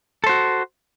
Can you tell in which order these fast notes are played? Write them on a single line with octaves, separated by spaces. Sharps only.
A4 C5 F#4